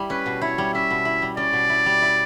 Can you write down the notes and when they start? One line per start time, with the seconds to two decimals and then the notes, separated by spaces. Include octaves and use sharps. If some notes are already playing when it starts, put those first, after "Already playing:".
Already playing: G3 E4
0.10 C#4 B4
0.26 B2
0.42 E4 C#5
0.58 G3
0.74 C#4 E5
0.91 B2
1.05 E4
1.22 G3
1.37 C#4 D5
1.53 B2
1.69 E4
1.86 G3
2.02 E4